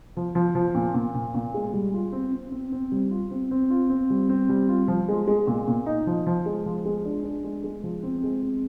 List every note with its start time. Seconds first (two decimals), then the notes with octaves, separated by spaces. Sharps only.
0.17 F3
0.35 F3
0.55 F3
0.75 A#2
0.94 A#2
1.14 A#2
1.34 A#2
1.54 G#3
1.73 G3
1.94 F4
2.12 C4
2.32 C4
2.52 C4
2.72 C4
2.92 G3
3.11 F4
3.31 C4
3.51 C4
3.70 F4
3.90 C4
4.10 G3
4.29 C4
4.49 G3
4.69 F4
4.88 F3
5.08 G#3
5.27 G#3
5.47 A#2
5.68 A#2
5.86 D#4
6.07 F3
6.26 F3
6.46 G#3
6.66 F3
6.85 G#3
7.06 D4
7.24 D4
7.44 G#3
7.64 G#3
7.83 F3
8.03 C4
8.23 G#3
8.43 C4